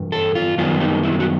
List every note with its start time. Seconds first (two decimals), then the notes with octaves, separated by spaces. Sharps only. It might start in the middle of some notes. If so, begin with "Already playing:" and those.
Already playing: G2 E3
0.12 A4
0.35 F4
0.58 F#2 D#3 G3 B3 F4
0.80 D#4
1.03 E4
1.20 F#4